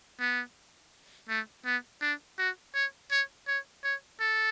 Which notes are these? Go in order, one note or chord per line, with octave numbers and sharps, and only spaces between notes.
B3
A3
B3
D4
F#4
C#5
C#5
C#5
C#5
A4